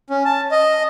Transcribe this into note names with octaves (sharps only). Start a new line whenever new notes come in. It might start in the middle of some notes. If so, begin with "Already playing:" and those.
C#4
A5
D#5